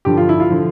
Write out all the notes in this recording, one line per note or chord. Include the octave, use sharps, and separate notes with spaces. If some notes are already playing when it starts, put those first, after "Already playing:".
G2 D3 F3 G4
F4
E4
F4
D3 F3